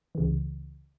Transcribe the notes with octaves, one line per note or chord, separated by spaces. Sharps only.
C#2 C#3 E3